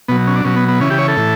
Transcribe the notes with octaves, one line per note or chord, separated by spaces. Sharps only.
B2 F#3 B3
C#4
D4
B2 F#3 C#4
B3
B3
C#3 E3 C#4
G4
C#5
A4
A2 E3